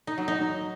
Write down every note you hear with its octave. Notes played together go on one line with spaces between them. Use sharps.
D#4
F#3
D#4